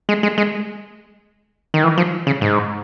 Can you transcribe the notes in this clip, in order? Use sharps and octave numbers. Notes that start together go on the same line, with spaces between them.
G#3
G#3
G#3
D#3
E3
F3
C#3
G#2